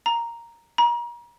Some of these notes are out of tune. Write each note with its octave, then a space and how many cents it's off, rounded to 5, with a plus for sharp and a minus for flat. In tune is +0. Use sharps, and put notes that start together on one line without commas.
A#5 +0
A#5 +35